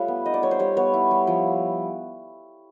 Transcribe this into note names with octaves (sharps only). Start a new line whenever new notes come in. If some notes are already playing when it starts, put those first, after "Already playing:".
Already playing: G3 A3 F4 B4 C#5
B3
D#4 D#5
D5
G3 C#5
C5
G3 C#5
B3 C#5
E4
G3
F3